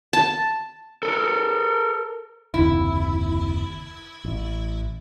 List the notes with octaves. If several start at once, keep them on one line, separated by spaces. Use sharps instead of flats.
A5
A4 A#4
F#1 D#2 C3 E4
A1